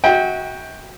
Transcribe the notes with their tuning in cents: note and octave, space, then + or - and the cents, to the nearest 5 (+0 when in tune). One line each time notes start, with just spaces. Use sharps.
F#4 +0 E5 -40 G5 +10